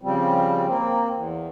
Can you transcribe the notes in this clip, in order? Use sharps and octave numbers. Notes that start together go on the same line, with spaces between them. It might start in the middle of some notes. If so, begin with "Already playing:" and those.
C#3 F3 G3 C4
A#3 C4
E2